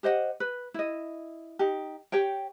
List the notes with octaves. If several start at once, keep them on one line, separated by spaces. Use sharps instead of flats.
G4 C5 D#5 F#5
B4
E4 D#5
D#4 G4
G4 C#5 G5